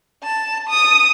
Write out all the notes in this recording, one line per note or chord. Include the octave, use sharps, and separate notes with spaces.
A5
D#6